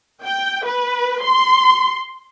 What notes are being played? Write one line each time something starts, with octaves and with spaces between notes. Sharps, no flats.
G5
B4
C6